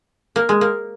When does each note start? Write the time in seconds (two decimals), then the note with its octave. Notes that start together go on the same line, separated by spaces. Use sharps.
0.36 A#3
0.49 G#3
0.61 A#3